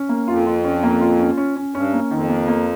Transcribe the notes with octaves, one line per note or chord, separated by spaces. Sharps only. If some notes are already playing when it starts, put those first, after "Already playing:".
Already playing: C#4
A#3
F2 F4
F4
C#4
A#3
F4
C#4
C#4
C#4
G2 C#4
A#3
F2 D#3
A#3
A#3